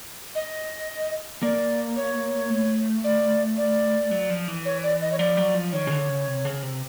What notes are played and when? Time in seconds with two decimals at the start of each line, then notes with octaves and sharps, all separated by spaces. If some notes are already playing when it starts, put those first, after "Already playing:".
0.35 D#5
1.43 A#3 D5
1.96 C#5
2.50 A3
3.04 D5
3.58 D5
4.11 F#3
4.30 F3
4.48 E3
4.65 C#5
4.83 D5
5.01 D#5
5.12 C#5
5.19 F3 D5
5.37 F#3
5.55 F3
5.73 D#3 C#5
5.87 C#3
5.90 D3
6.09 C#3
6.27 C3
6.45 C#3
6.62 C3